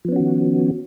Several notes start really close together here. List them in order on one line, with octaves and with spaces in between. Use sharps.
F3 B3 C#4 F#4 D#3